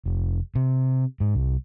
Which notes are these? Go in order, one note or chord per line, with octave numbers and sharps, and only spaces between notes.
F1
C3
G#2
C2